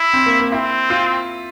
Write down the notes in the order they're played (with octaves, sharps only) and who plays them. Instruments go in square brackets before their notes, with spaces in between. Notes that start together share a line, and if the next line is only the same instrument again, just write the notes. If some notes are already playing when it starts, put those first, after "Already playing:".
Already playing: [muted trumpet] E4
[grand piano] C4
A#3
A#3
[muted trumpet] C4 [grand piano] E4
[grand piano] F4